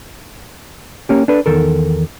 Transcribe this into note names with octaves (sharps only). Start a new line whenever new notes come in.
A#3 C#4 G4
D4 A4 B4
E2 D#3 A4 A#4